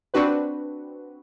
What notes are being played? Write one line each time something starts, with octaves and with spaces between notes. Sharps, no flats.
C4 D4 F#4 B4